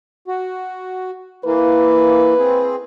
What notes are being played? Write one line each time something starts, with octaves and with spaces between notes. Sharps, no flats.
F#4
E3 A#3 B4
C4 G#4